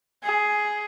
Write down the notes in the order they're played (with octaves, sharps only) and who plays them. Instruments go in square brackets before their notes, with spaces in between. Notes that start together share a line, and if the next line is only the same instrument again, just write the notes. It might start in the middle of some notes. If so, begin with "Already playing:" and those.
[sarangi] G#4